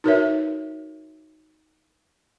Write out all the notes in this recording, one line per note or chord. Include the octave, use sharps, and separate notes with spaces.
D#4 F#4 A#4 B4 C#5 E5